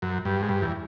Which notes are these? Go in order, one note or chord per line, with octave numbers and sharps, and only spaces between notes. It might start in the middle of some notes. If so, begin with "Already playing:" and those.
F#2
G2
G#2
G2
E2